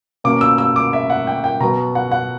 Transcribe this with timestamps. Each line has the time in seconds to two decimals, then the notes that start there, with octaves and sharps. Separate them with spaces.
0.24 B2 A#3 C#4 D6
0.41 E6
0.58 E6
0.76 D6
0.93 E5
1.10 F#5
1.27 G5
1.44 G5
1.60 B2 F#3 B3 A#5
1.95 F#5
2.11 F#5